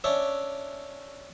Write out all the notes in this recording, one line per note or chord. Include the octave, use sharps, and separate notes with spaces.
C#4 D4 C#5 E5